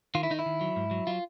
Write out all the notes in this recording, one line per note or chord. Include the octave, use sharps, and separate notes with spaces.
D#3 F4
E4
D#3 D#4
E4
D#3
F#3
G#2
F#3
F#3 F4